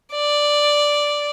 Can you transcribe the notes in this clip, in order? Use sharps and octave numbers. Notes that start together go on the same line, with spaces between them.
D5